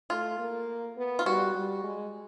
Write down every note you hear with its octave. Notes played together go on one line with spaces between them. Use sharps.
A3 F4
A#3
B3
F4
G3 F#4
G3
G#3